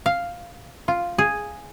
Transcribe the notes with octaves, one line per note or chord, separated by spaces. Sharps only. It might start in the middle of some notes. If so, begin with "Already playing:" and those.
F5
F4
G#4